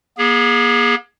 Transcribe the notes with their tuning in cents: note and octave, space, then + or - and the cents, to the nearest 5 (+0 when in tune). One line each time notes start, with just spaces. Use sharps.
A#3 +45 G#4 -10